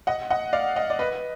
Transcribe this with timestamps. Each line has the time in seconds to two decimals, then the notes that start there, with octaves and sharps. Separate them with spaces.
0.07 D#5 F#5
0.30 D#5 F#5
0.53 D5 F5
0.76 D#5 F#5
0.90 D5
0.99 B4 D#5